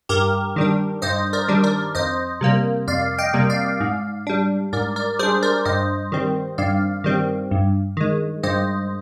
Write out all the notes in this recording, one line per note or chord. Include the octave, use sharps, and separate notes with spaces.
G2 G4 A#4
D#3 G3 D4
G2 C5 D#5
A#4 D5
D#3 G3 D4
A#4 D5
F2 C5 D#5
C3 G3 A#3
F2 D5 F5
D#5 G5
C3 G3 A#3
D5 F5
G#2
G3 D4
G#2 A#4 D5
A#4 D5
G3 D4 G#4 C5
A#4 D5
G2 C5 D#5
D#3 G3 C4
G2 D5 F5
D#3 G3 C4
G2
D#3 G#3
G2 C5 D#5